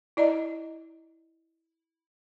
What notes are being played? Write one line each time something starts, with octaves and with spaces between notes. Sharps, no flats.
E4 D5 D#5 A#5